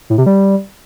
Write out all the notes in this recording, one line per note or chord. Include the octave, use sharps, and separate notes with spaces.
A2
C3
G3